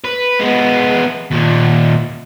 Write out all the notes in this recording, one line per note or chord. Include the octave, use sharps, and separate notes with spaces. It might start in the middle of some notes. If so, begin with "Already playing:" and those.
B4
G#3 B3
D#2 A#2